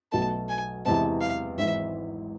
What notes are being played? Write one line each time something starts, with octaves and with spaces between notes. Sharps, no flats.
B1 B2 A3 A5
G#5
E2 C3 E3 G#3 B3 A5
F5
G#1 G#2 E3 E5